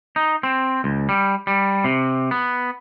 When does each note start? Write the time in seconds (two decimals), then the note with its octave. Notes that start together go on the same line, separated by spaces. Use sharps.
0.16 D#4
0.43 C4
0.84 C#2
1.09 G3
1.47 G3
1.84 C3
2.31 B3